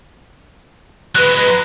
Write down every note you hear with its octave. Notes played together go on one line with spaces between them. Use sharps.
F#3 G#3 B4 A#5 F#6